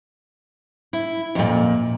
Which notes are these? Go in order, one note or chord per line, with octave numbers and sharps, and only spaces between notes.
E4
F2 A#2